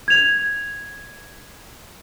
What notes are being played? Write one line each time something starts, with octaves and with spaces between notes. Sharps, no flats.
G#6 F7